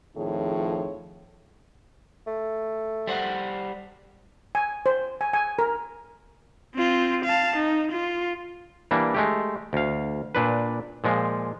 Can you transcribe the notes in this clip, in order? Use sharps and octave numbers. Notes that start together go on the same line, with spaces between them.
F2 A2 D#3 F3 G#4 C#5
A3
G3 C5 F#5
G#5
C5
G#5
G#5
A#4
C4 F4
F5 A5
D#4
F4
E3 G3 A#3 D4
G#3 A3 G4
D2 F5
A#2 D4 B4
A#2 F3 G#3